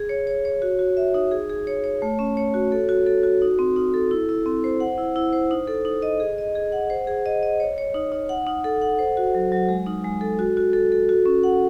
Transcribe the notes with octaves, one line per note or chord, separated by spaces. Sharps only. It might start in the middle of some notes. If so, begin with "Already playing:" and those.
Already playing: G#4
C#5
C#5
C#5
F#4
F#4
E5
D#4
G#4
G#4
C#5
C#5
A3
C#4
C#5
F#4
A4
F#4
A4
F#4
D#4
C4
D#4
A4
E4
E4
C4
C5
F#5
E4
E4
C5
D#4
A4
D#4
D#5
G#4
D#5
G#4
F#5
C5
G#4
D#5
D#5
C#5
C#5
D#4
D#4
F#5
D#4
A4
F#5
C5
F#4
F#3
F#3
G#3
D#4
G#3
A4
F#4
F#4
A4
A4
F#4
C#4
F#5